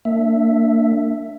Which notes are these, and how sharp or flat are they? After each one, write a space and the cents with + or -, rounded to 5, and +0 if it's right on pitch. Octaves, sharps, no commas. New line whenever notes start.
A#3 -30 D4 +0 E5 +5